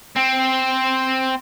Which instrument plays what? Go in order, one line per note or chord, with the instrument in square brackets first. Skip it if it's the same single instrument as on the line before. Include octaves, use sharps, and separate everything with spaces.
[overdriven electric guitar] C4